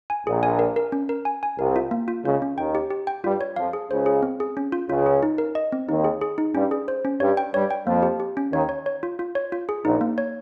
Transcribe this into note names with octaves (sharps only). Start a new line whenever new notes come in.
G#5
A#1 A#2 G#4
G#5
A#4
A#4
C#4
A#4
G#5
G#5
C2 C3 A#4
F4
A#3
F4
C#2 C#3 F4
C#4
D#2 D#3 G5
G4
G4
G5
G2 G3 F4
C#5
F2 F3 F5
G#4
C#2 C#3 C5
G#4
C4
G#4
C#4
F4
C#2 C#3 F4
G#4
D#4
A#4
D#5
C4
D#2 D#3 D#4
G#4
G#4
D#4
G2 G3 C#4
G#4
C5
C#4
G2 G3 C#5
G5
G2 G3 C#5
G5
F2 F3 A#3
G4
G4
C#4
D#2 D#3 C#5
C#5
C#5
F4
F4
C#5
F4
G#4
A#1 A#2 D#4
A#3
C#5